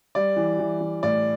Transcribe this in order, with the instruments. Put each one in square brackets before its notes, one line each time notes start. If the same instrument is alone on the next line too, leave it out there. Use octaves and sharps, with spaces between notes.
[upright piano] G3 D5
E3
E3
E3
A2 D5